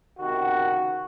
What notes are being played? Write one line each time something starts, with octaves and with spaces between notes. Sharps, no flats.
C#2 C3 D#3 A#3 F#4